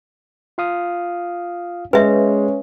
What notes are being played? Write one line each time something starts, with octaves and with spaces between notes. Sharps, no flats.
F4 F5 D#6
G#3 C#4 B4 E5